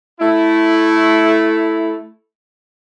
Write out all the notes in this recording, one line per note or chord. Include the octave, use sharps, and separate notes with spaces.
A3 E4